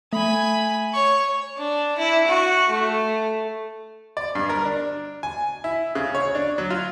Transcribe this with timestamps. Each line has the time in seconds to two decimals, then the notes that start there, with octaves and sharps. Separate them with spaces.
0.13 A3 G#5 B5
0.93 C#5 C#6
1.58 D4
1.98 E4
2.27 F#4
2.69 A3
4.17 D5
4.35 G2
4.49 A#4
4.65 D4
5.23 G#5
5.64 E4
5.95 C#3
6.15 C#5
6.35 D4
6.58 F#3
6.70 F4